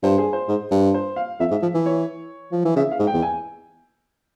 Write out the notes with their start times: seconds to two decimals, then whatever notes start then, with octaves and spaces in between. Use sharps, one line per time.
0.03 G2 C5
0.18 G#4
0.33 C5
0.48 G#2
0.71 G2
0.94 C5
1.16 F5
1.40 F2 E5
1.51 G#2
1.62 F3
1.74 E3
1.86 C#5
2.52 F3
2.65 E3
2.76 C#3 E5
2.91 F5
2.99 G#2
3.07 G5
3.13 E2
3.22 G#5